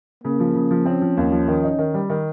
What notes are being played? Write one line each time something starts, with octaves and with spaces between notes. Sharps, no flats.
C#3 A#3
F3
C#3
F3
C4 C#4
F3
D#2
F3
D#3
D#4
D#3
G3
D#3